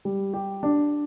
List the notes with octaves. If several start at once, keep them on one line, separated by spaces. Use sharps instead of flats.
G3
G4
D4